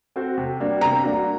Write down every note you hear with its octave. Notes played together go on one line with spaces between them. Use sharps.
C4 F#4 A4 C5
C3
G3 A#3 D4 F#4
C3 A#5
G3 A#3 D4 F#4